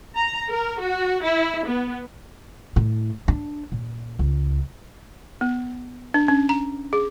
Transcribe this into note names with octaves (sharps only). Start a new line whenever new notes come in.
A#5
A#4
F#4
E4
B3
A2
D4
A#2
C#2
B3
D4
C#4
A#5
G#4